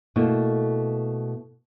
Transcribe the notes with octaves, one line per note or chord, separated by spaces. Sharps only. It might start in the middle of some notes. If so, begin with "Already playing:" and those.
B2 A3 A#3 E4